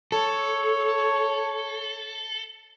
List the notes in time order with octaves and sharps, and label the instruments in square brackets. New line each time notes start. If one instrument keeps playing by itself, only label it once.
[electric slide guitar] A4 [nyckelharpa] C#5